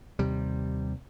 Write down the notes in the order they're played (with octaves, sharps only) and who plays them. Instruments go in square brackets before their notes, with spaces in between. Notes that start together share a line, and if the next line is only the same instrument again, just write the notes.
[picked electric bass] D#2 C3 G3